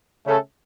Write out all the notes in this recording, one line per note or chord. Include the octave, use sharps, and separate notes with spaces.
C#3 A3 C#4 A4